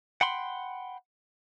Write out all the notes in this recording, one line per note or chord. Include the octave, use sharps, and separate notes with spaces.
F#5 G5 B5 C6